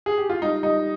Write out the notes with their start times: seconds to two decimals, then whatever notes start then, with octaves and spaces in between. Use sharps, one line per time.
0.06 G#4
0.18 G4
0.29 F4
0.42 G3 D#4
0.63 G3 D#4